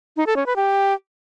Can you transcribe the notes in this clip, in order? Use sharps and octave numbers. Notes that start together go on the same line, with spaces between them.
D#4
A4
C#4
B4
G4